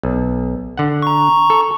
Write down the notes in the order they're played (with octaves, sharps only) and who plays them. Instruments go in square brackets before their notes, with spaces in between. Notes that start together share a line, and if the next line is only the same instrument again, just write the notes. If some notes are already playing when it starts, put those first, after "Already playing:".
[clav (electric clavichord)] B1
D3 F#5
[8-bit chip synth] A#5 C#6
[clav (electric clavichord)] A4